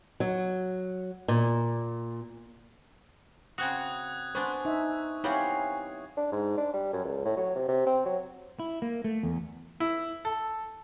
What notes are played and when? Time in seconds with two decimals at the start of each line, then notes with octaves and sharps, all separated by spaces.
0.20 F#3
1.28 A#2
3.58 C#3 C4 F#4 D#6 F#6 G#6
4.35 B3 D4 C5 G#5 C#6
4.65 D#4 E5
5.24 G3 B3 C4 E4 C#5 F5 G#5
6.17 D4
6.32 G#2
6.58 D4
6.74 G3
6.93 F#2
7.05 C#2
7.25 A2
7.37 F#3
7.55 C3
7.68 C3
7.86 C4
8.05 F#3
8.59 E4
8.82 A#3
9.04 A3
9.23 E2
9.80 E4
10.25 A4